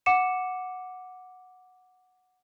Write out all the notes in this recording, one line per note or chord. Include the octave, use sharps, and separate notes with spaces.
F#5 D6 C#7 E7